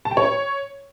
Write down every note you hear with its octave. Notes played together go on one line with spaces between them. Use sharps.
A5
G5
C#5